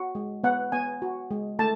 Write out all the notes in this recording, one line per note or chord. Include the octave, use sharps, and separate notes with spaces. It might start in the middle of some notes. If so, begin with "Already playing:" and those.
Already playing: F#4
G#3
B3 F#5
B3 G#5
F#4
G#3
A3 A5